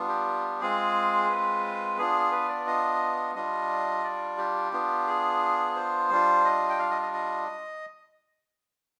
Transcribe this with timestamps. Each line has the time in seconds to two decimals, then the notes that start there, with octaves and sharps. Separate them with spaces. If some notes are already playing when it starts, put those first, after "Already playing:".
Already playing: G3 B3 D4 F4
0.09 G4
0.61 G#3 C4 F4 G#4
1.29 B4
1.98 B3 D4 F4 G#4
2.32 B4
2.49 D5
2.67 D#5
3.35 G3 D4 F4 D#5
4.04 D5
4.38 G4
4.72 B3 D4 F4
5.07 G#4
5.76 C5
6.10 G3 D4 F4
6.45 D#5
6.70 G5
6.79 F5
6.91 D#5
7.02 D#5
7.14 D#5